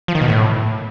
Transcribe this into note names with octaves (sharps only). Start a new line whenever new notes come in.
F3
D#3
B2
A2